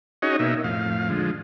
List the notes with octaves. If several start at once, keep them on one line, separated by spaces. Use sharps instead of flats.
C#4 D#4 F#4 G#4 C#5 D#5
B2 A#3 D#4 E5
F2 A2 F5
D3 F3 G#3